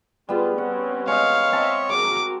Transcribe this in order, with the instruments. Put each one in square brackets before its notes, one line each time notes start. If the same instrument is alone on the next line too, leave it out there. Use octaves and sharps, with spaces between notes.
[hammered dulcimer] G3 B3 [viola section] F4 G#4
[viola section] G3 C4 C#4 [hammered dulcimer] F#5
[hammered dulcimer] G#3 D#5 [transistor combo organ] C#5 [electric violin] F5
[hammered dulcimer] C4 A5 C6 [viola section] D#5 E5
[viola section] F#4 G#4 A#4 [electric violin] D6